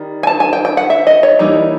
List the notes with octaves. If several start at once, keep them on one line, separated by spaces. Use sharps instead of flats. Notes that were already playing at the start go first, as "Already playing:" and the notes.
Already playing: D#3 G3
G#5
A5
G#5
G5
G5
F#5
E5
D#5
C#5
E3 G3 A#3 D#4